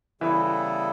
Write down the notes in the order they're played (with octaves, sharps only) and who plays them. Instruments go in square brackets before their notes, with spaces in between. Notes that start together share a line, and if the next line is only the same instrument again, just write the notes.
[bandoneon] C#3 G3 B3 E4 A4 [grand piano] E3